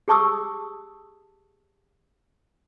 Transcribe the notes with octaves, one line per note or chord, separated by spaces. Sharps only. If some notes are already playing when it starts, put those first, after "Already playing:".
G4 G#4 A5 C#6 D#6 E6